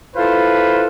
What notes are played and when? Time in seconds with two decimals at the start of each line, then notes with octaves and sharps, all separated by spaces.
0.16 E4 F4 A4 B4 C5